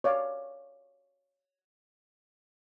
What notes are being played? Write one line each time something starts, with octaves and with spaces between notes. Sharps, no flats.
C#5 D5 F5